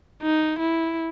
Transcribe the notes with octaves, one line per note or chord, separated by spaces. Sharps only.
D#4
E4